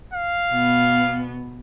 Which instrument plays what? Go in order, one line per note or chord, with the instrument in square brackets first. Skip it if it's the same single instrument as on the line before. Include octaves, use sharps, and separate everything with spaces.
[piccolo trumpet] F5
[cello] B2 B3